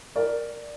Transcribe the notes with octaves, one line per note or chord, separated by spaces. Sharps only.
A#4 D5